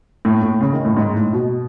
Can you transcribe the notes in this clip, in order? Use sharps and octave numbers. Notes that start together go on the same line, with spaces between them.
A2
A2
C#3
D#3
A2
G#2
A2
B2